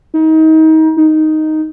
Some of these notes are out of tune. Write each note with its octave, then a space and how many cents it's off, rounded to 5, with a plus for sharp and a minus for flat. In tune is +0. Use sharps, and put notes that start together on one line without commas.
D#4 +30
D#4 +0